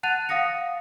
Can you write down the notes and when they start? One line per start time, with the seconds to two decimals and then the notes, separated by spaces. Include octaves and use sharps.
0.03 F#5 A5 F#6 A6 D#7 F7
0.29 F5 F#5 D#6 A#6 C#7